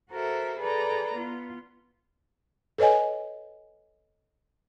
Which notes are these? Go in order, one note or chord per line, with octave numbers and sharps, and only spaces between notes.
F#4 A4 A#4 C5 E5
G#4 A4 B4 D5 A#5
B3 F4
A4 B4 C#5 D#5 G#5